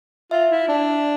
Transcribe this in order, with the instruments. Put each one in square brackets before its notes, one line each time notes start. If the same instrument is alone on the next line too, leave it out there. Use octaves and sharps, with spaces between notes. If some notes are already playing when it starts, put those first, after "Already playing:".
[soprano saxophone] F4 [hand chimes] E5
[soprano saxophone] E4
D4